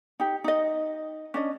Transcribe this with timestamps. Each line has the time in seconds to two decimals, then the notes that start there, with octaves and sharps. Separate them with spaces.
0.20 D#4 G4
0.44 D#4 D#5
1.34 C#4 D4 D#5